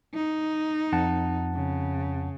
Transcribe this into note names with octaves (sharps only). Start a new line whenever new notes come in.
D#4
F2 F#5 A5
C#3